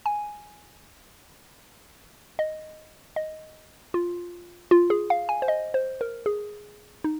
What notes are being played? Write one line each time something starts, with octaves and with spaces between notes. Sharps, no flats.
G#5
D#5
D#5
F4
F4
G#4
F5
G#5
C5
D#5
C5
A#4
G#4
D#4